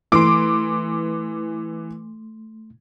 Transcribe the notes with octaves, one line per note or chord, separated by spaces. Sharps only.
E3 A3 C6 D6